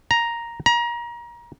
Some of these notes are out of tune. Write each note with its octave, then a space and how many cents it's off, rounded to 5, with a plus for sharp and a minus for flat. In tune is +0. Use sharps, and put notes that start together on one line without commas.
A#5 +5
A#5 +30